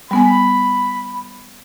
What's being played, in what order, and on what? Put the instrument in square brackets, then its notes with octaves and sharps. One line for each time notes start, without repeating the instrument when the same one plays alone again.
[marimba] G3 B3 G#5 [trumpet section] B5